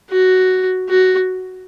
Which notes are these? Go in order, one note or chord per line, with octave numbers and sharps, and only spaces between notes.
F#4
F#4